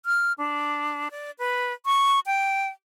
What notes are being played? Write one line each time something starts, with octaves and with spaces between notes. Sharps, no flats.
F6
D4
D5
B4
C#6
G5